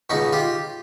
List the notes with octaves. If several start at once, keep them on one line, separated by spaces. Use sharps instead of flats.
C#2 B2 C#4 D#4
F4 G4